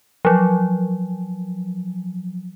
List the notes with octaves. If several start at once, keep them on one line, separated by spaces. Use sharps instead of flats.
F3 F#3